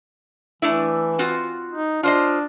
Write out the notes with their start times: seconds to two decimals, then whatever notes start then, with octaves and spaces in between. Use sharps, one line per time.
0.62 E3 A3 D4 E4
1.19 C4 F4 F#4
1.72 D#4
2.03 D4 F4 C5 D#5